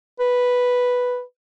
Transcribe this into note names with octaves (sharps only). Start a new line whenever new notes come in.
B4